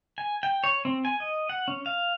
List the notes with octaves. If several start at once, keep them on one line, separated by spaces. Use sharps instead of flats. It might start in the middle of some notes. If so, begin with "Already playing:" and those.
G#5
G5
C#5
C4
G#5
D#5
F#5
C#4
F5